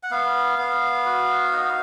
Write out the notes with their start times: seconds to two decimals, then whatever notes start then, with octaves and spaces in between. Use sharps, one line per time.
0.03 F#5
0.11 B3 F5
0.58 B3
1.06 F#4
1.52 D#4